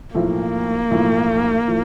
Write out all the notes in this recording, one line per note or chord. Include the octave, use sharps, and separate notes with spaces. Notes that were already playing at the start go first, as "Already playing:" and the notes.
B1 A2 F3 A3 A#3
B1 A2 F3 A3
A2 F3